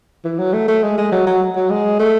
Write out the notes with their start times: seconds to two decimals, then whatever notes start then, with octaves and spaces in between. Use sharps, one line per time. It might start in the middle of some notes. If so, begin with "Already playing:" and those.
0.24 E3
0.39 F#3
0.53 A3
0.68 A3
0.83 G#3
0.98 G#3
1.12 F#3
1.27 F#3
1.56 F#3
1.70 G#3
1.99 A3